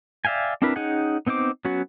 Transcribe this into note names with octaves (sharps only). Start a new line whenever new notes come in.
D5 E5 F5 G5 G#5
C4 D4 E4 A#4 B4
C#4 D#4 G#4 F#5 G5
B3 C4 D#4 C5 D6
F#3 B3 C#4 F#4